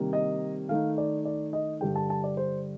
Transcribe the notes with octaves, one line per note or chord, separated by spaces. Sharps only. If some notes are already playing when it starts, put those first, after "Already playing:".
Already playing: C3 D#3 G3 A#3
D#5
D#3 A3 D#4 F5
D5
D5
D#5
G2 D3 G3 D4 G5
A5
A5
D5
C5